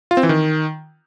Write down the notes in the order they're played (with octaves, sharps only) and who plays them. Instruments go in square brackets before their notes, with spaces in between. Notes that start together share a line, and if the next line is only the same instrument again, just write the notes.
[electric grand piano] F4
C4
E3
D#3